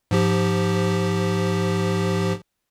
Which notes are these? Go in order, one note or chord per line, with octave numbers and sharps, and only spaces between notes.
G#2 F3 G4